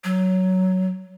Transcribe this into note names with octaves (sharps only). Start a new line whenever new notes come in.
F#3